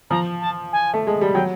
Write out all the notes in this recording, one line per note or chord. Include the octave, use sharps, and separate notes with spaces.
F3 A#5
A5
G#5
A3
G#3
G3
F#3 G5